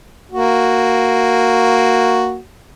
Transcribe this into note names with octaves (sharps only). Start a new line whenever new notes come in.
A#3 F#4